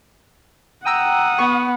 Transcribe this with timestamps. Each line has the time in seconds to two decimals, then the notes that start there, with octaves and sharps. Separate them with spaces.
0.86 F#5 G5 A#5 D#6 E6
1.38 B3 C#6